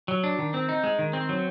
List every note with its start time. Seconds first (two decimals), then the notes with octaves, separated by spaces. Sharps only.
0.08 F#3
0.24 D4
0.39 D#3
0.54 C4
0.69 D#4
0.83 G#3
0.99 D#3
1.13 C4
1.29 F#3